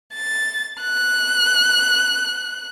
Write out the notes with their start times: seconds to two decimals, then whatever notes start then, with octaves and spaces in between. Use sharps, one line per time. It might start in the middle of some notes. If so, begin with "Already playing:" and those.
0.14 A6
0.81 F#6